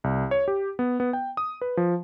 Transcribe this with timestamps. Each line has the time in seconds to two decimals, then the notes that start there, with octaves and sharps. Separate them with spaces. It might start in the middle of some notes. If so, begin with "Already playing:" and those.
0.04 C2
0.31 C#5
0.48 G4
0.79 B3
1.00 B3
1.13 G5
1.37 D#6
1.61 B4
1.77 F3